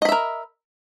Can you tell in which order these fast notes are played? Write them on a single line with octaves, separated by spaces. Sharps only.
D#5 B5 E5 A#4